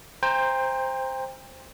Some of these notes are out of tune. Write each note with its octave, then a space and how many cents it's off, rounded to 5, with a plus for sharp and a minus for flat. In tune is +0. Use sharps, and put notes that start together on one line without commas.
C5 +0 G5 +30 A#5 +0